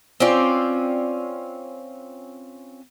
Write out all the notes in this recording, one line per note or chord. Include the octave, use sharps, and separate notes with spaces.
C4 C#4 F4 D5